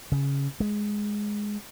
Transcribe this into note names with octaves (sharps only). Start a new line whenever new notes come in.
C#3
G#3